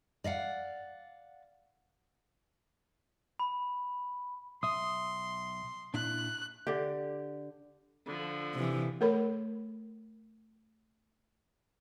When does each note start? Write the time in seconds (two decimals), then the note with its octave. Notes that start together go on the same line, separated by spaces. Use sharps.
0.24 D5 D#5 F5 F#5
3.40 B5
4.63 B1 E5 C6 D#6
5.94 A#2 D4 E4 F#6
6.67 D3 G4
8.06 D3 F3
8.54 C3 E3
9.01 A3 A4 A#4 C#5 B5